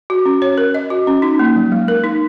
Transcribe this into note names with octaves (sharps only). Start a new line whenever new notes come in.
F#4
C#4
C#5
A#4
D#5
F#4
C#4
D#4
A#3
F#3
G#3
A#4
D#4